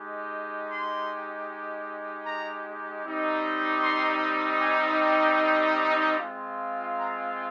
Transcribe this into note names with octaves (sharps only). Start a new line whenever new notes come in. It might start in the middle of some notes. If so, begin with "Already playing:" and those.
Already playing: G#3 D#4 G4
C6
A#5
G3 C4 D#4 G4
C6
G#5
G5
G#3 C4 F4
A#5